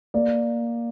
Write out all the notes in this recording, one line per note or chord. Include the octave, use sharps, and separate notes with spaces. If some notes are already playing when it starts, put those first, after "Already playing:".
A#3 D5